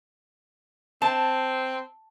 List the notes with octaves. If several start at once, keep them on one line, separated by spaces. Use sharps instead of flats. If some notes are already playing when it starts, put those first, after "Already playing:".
C4 A5